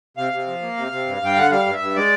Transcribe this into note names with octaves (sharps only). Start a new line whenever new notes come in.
C3 F5
C3
F3
A#3
C3
C3
G2
G2 G5
D3 F#5
G3 F5
G2
E5
G2
G#3 D5